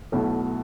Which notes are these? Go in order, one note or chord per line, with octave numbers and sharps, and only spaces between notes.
B1 B2 A3 E4